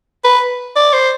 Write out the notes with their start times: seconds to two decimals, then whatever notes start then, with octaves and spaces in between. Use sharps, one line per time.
0.24 B4
0.76 D5
0.93 C5